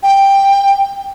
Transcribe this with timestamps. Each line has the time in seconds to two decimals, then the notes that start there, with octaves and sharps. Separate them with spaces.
0.03 G5